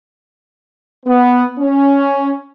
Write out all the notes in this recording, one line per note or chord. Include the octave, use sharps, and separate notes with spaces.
B3
C#4